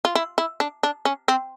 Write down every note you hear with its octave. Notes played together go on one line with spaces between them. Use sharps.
F4
E4
E4
D4
D4
C#4
C4